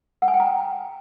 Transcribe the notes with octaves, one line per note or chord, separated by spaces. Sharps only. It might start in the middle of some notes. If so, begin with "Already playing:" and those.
F#5
G#5
G5
A#5